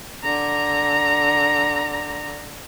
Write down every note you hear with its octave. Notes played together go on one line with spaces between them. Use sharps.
D3 A#5